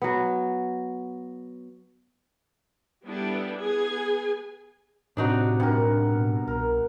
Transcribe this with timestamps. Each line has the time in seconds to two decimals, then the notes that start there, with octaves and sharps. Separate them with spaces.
0.02 F#3 B3
3.05 G3 B3 D4 E4 G4 A4
3.58 B3 G#4 G#5
5.17 A2 C3 D4 D#4 F#4
5.60 G2 A#4 F#5
6.02 B2
6.48 C2 A#4